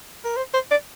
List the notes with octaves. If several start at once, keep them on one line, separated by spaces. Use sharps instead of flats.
A#4
C5
C5
D5